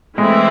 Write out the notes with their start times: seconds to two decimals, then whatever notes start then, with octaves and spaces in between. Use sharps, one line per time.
0.18 E3 G#3 A3 C4 E4